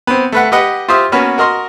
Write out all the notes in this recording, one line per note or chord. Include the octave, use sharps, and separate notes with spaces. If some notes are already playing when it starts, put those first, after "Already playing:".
B3 C4
A3 B4 F#5
G4 B4 D#5 F#5
F4 G4 C5 E5 D#6
A#3 B3 C#4 F#4 B4
F#4 A#4 D#5 C6